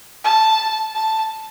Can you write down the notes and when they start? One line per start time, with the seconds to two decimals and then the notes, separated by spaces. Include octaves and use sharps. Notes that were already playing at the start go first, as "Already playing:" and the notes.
0.24 A5
0.95 A5